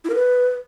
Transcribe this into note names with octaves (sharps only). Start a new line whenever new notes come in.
E4
A#4
B4